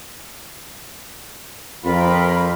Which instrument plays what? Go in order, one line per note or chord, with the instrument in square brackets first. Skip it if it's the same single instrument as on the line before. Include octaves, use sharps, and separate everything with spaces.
[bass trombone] F2 [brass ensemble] C4 F4 [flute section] A#4 B5